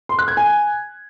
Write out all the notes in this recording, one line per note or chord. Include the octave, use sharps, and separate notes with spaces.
C6
F#6
G#6
G#5